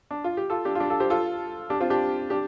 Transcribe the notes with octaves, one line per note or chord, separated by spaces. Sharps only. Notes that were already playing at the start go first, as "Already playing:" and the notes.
D4
F4
G4
F4 A4
D4 G4
F4
D4 G4
F4 A4
G4 C5
F4 A4
D4 G4
C4 F4
D4 G4
D4 G4